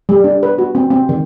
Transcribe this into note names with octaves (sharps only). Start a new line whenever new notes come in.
G3
D4
B4
F#4
C4
C4
D#3